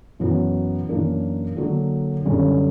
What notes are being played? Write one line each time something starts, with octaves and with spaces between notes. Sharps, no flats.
F#2 E3 B3 F#4
F#2 E3 A#3 D4 A#4
D3 F#3 A#3 D4 F#4
F#2 D3 G3 C#4